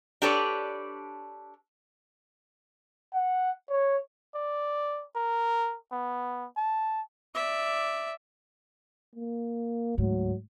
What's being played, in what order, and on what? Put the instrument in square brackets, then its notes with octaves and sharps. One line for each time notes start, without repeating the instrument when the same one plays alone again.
[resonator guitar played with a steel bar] D4 G4 A4 B4 C#5 D5
[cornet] F#5
C#5
[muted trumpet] D5
A#4
B3
A5
[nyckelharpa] D5 E5
[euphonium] A#3
[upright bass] D2 G#2 [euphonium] F#3